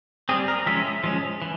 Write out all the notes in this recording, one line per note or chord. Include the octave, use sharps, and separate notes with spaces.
G3 C4 G#4
A#4
F3 G#3 C#4 E5
F3 G#3 C#4
E3